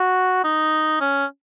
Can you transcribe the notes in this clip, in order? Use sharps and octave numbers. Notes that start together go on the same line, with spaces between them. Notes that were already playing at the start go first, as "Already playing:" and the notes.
Already playing: F#4
D#4
C#4